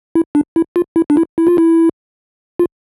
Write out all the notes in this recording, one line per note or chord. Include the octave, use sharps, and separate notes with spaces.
E4
D4
E4
F4
E4
D4
E4
E4
F4
E4
F4